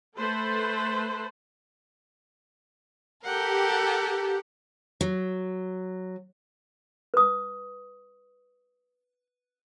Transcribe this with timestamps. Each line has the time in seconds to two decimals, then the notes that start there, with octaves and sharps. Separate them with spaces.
0.17 A3 A4 B4 C5
3.24 G4 A4 A#4 F#5 G5
5.01 F#3
7.14 B4 D#6